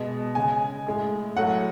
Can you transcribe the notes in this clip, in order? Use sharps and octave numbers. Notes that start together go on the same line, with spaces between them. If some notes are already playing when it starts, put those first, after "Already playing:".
Already playing: B2 G#3
C#3 G#3 G#5
A2 G#3
A2 F#3 A3 F#5